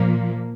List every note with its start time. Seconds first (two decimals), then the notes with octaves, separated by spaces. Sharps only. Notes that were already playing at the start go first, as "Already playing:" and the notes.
Already playing: A#2 F3 A#3